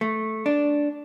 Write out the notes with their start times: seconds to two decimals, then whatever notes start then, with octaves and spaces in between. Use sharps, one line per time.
0.01 A3
0.46 D4